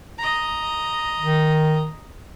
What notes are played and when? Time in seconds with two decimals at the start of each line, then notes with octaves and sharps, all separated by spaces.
0.18 D#5 A#5
1.20 D#3